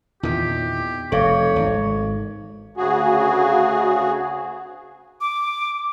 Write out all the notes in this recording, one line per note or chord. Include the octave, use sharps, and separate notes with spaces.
E2 A#2 D#3 G4
F1 A4 C#5 F5
G#1
D2 C#3 F#4 G#4
D6